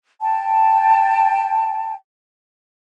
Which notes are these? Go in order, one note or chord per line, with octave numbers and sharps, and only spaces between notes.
G5 A5